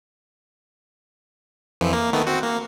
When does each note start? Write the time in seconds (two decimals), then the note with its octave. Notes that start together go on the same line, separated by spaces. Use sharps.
1.81 F2 E3 F3
1.93 A#3
2.13 D#3 A3 B3
2.27 C4 F#4
2.43 A#3